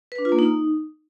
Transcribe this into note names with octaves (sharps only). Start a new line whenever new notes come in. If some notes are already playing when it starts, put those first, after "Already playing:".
B4
D4
F4
A#3
D#4